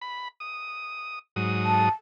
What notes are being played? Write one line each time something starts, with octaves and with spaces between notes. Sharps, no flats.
B5
D#6
G#2 F#3 D#6
A5